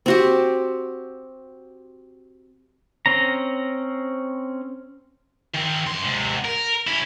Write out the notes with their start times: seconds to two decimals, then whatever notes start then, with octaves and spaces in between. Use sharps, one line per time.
0.06 C4 F#4 G4
3.06 C4 C#4 A#5
5.55 D#3 C4
5.87 F#2 C6
6.05 G#2 C3
6.45 A#4
6.87 C#4 E4